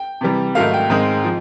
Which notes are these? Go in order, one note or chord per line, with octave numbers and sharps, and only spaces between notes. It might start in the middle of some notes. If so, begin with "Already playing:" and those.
Already playing: G5
C3 E3 G3
G#2 D#3 F#3 A3 F5
G5
G#2 D#3 G#3 C4
F3